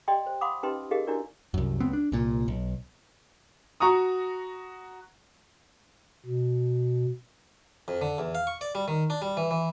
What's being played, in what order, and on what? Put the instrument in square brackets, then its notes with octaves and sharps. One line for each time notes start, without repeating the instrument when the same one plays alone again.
[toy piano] G4 D5 D#5 G5 C6
C5
F5 F#5 B5 C6 D6 D#6
C#4 D#4 G4 B4 D#5 C6
D#4 G4 G#4 A#4 D#5 F5
D4 E4 F#4 G4 A#4 D5
[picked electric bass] C2 F#2
C#2 B3 C4
D4
C2 A#2
B1
[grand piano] F#4 A#5 C#6 D#6
[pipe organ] B2
[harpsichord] F2
D3
E2
F5
C#6
D5
G3
D#3
D4
G3
E3
E3